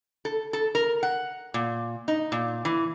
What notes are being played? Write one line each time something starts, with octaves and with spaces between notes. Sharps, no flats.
A4
A4
A#4
F#5
A#2
D#4
A#2
E3